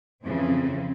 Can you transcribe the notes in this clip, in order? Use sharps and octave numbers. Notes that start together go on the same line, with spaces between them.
F2 C#3 E3 C4